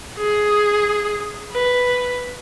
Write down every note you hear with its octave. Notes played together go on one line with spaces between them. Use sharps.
G#4
B4